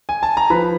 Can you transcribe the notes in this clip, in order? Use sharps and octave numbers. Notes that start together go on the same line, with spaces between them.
G#5
A5
A#5
F3 B4 B5